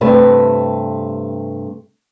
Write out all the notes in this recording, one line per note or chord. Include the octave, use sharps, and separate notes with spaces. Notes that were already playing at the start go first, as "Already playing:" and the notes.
G2 C3 A3 B4